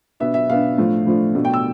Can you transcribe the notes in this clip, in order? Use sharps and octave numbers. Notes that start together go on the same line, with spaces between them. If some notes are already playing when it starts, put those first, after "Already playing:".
B2 B3 D4 E5
E5
B2 B3 D4 F5
A2 F3 A3 D4
A2 F3 A3 D4
B2 A3 D4
G5
E6